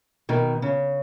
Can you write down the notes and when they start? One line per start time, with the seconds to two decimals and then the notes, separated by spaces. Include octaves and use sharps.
0.29 B2 D#3
0.62 C#3